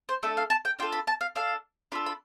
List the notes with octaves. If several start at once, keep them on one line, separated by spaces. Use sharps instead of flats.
C5
A3 D4 A4 E5
F5
A5
G5
D4 F4 A4 G5
B5
A5
F5
D4 A4 F5
D4 F4 A4 B5
B5